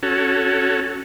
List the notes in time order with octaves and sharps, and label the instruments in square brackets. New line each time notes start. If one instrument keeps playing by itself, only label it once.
[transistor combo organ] C#4 F#4 A4